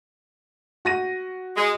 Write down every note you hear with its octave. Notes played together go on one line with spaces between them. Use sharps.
F#4 A#6 D#7
G#3